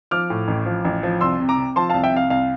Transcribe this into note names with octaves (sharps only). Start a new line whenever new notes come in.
F3 D6 F6
A2
A1
F3
A1
F3
C2 C6 E6
C3
A#5 D6
C3
F3 A5 C6
C2 F5 A5
E5 G5
C3 F5
C2 F5